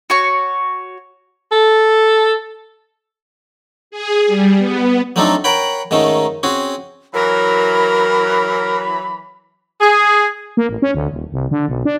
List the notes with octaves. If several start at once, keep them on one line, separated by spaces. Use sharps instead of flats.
F#4 C#5 C#6
A4
G#4
G3
B3
F#3 A3 C4 D4 D#4 A4
A#4 C#5 F#5 G5 B5
G#2 D#3 A3 C#4 D#4
C4 C#4 F#4 G#4
E3 F#3 A#4 B5
G#4
A#3
A1
C#4
D2
D#1
C2
D3
B1
D4